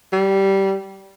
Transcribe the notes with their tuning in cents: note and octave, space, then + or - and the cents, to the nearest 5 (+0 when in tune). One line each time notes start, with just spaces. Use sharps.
G3 -15